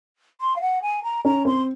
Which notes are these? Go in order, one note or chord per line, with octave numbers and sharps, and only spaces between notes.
C6
F5
F#5
G#5
A#5
C#4 A#5
C4 C6